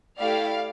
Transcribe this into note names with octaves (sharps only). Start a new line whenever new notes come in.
A3 E4 G4 D5 F5